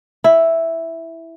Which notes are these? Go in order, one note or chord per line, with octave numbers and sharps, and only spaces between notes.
E4